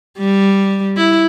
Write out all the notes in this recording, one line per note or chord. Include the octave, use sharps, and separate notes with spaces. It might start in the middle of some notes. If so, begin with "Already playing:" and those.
G3
E4